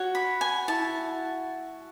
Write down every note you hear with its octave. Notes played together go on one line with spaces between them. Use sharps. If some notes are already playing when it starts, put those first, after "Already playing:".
Already playing: F#4 C#5
B5
G#5
E4 A5